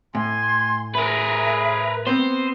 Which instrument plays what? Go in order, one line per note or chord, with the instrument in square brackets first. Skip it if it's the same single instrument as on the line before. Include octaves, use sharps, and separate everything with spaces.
[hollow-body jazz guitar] A2 [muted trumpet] G#5 [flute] C6
[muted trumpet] G#4 [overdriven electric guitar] A#4 B4 [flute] E5
[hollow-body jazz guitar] B3 C4 [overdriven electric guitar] C5